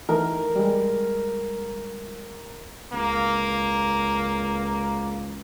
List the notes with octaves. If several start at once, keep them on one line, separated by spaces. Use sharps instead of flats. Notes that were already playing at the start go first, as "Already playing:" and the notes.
E3 A3 D#4 A#4
G3 G#3
C#2 A#3